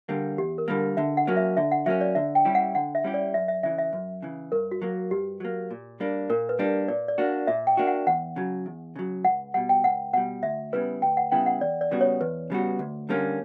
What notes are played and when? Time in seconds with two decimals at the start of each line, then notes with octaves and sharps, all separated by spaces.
0.09 D3 G3 A#3
0.38 E2 G4
0.58 A#4
0.68 D3 G3 A#3
0.97 D3 E5
1.17 F#5
1.27 F#3 A#3 C#4
1.37 E5
1.57 D3 E5
1.72 F#5
1.86 F#3 A#3 C#4 E5
2.01 D5
2.15 D3 E5
2.35 G5
2.45 G3 C#4 E4 G4
2.55 F#5
2.75 D3 F#5
2.95 E5
3.04 G3 C#4 E4 G4
3.14 D5
3.34 F#2 E5
3.48 E5
3.63 C#3 E3 E5
3.78 E5
3.93 F#2
4.23 C#3 E3
4.52 G2 A#4
4.71 F#4
4.82 F#3 A#3
5.11 G2 G4
5.40 F#3 A#3
5.71 A#2
6.00 G3 A#3 D4
6.30 A#2 A#4
6.49 B4
6.59 G3 A#3 D4
6.88 A#2 D5
7.08 D5
7.18 A#3 D4 F#4
7.47 A#2 E5
7.67 G5
7.77 A#3 D4 F#4
7.87 F#5
8.07 E2 F#5
8.36 C#3 F#3
8.66 E2
8.96 C#3 F#3
9.24 C#2 F#5
9.54 B2 G3 F#5
9.69 G5
9.84 C#2 F#5
10.13 B2 G3 F#5
10.43 D2 E5
10.73 C#3 G3 B3 E4 B4
11.02 D2 G5
11.17 F#5
11.32 C#3 G3 B3 E4 G5
11.46 F#5
11.61 E2 D5
11.81 D5
11.91 C#3 G3 B3 F#4
12.01 C#5
12.21 E2 B4
12.50 C#3 G3 B3 F#4
12.79 D2
13.09 D3 G3 A#3 C#4